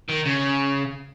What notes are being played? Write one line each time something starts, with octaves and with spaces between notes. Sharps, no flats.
D#3
C#3